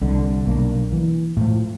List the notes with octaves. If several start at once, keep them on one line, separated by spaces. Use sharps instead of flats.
C2 D3
B1 A#3 D4
E3
A2 F3